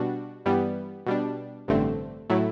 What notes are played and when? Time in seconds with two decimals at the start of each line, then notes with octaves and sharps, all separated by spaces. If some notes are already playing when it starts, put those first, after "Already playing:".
Already playing: B2 G3 D4 F#4
0.46 G2 E3 G3 B3
1.06 B2 G3 D4
1.68 A1 G2 D3 A3 C4
2.30 A2 F#3 A3 E4